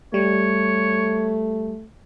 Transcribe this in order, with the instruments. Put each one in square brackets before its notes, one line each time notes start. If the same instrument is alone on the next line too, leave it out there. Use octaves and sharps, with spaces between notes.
[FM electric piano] G3 [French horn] A3 [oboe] C#5